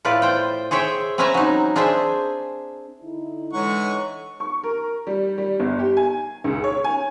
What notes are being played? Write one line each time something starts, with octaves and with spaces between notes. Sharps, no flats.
A2 F4 B4 D5
C5 G5
G#4 C5 C#5 E5 G5
C4 C#4 B4 E5 G#5 A#5
F#3 D#4
D4 G#4 C5 E5 G#5
D3 D#4 E4
E3 G#3 A4 C#5 F#5 A#5 C#6
C#6
A#4
G3
G3
G1
G4
G#5
C#2
C#5
G#5